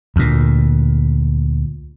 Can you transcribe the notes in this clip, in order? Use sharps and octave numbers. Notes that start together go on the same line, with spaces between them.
D2 A#2